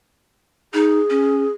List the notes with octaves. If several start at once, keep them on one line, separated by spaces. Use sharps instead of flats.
D#4 G#4
C#4